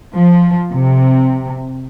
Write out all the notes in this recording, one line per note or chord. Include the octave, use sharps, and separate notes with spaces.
F3
C3